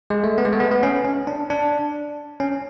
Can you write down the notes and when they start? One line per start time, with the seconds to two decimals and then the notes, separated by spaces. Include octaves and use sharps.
0.10 G#3
0.24 A3
0.38 B3
0.45 G#3
0.53 A3
0.60 B3
0.71 B3
0.83 C#4
1.05 C#4
1.27 D4
1.50 D4
2.40 C#4